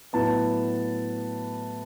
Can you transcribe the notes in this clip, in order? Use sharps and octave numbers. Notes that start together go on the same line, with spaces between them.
A2 F#3 B3 A5